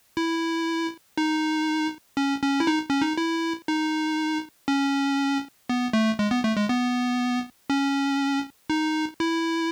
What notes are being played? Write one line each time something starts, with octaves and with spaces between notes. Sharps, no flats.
E4
D#4
C#4
C#4
E4
D#4
C#4
D#4
E4
D#4
C#4
B3
A3
G#3
B3
A3
G#3
B3
C#4
D#4
E4